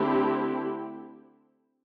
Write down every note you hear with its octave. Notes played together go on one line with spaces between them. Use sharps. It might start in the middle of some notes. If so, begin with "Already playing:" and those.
Already playing: D3 A3 C4 E4 G4